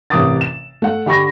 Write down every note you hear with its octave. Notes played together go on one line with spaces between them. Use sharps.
A1 C3 A#4 D6 D#6 A6
E7
A3 F#5
D3 G4 B5 C#6 A#6